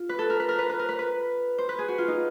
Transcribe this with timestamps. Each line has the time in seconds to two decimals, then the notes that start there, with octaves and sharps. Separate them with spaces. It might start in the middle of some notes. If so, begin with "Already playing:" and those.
Already playing: F4
0.09 B4
0.19 A4
0.30 A#4
0.40 B4
0.49 A#4
0.58 B4
0.69 B4
0.79 A#4
0.89 B4
0.99 B4
1.58 C5
1.69 B4
1.78 G#4
1.88 F#4
1.98 F4
2.08 D#4